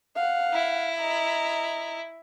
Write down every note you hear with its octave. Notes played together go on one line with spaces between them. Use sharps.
F5 F#5
E4
D#5 A#5